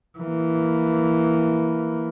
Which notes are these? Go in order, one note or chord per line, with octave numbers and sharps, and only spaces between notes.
E3 A#3